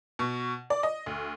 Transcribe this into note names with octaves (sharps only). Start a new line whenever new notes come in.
B2
D5
D#5
D2